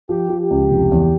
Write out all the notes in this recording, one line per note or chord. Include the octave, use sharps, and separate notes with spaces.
F3 G4
F3
G4
C#2
F1
E2